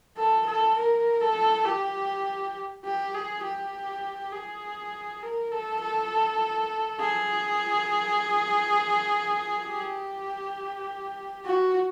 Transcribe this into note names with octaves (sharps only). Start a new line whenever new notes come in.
A4
A4
A#4
A4
G4
G4
G#4
G4
G#4
A#4
A4
A4
G#4
G4
F#4